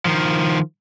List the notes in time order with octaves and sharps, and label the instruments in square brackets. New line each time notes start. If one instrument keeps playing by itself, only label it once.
[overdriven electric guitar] D#3 F3